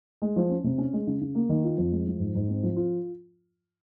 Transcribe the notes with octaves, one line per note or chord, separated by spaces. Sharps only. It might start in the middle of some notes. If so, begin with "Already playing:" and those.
G#3
F3
C#4
C3
C#4
G#3
C#3
C#3
A#3
D#3
F4
F2
G#3
F3
G#2
G#2
C4
F3
F4